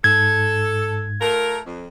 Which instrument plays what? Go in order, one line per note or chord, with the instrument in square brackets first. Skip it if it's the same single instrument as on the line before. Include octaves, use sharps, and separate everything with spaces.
[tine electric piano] G#2 [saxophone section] A4 [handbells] G#6
[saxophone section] A3 F4 A#4
F2